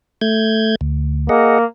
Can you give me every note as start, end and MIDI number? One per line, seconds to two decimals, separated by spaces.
0.21 0.75 57
0.21 0.75 91
0.21 0.75 92
0.81 1.29 38
1.29 1.65 58
1.29 1.59 68
1.29 1.59 75
1.29 1.59 78